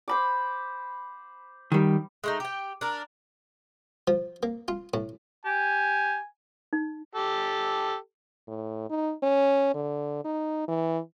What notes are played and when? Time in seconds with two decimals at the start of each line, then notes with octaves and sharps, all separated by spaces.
0.08 C5 B5 D6
1.72 D#3 G3
2.24 G#3 A3 D#4
2.40 G4 G5
2.81 D4 A#4
4.08 F3
4.43 A#3
4.68 F4
4.94 A2
5.45 G4 G#5
6.73 D#4
7.15 G4 A4
8.48 A2
8.90 D#4
9.23 C#4
9.74 D3
10.25 D#4
10.68 E3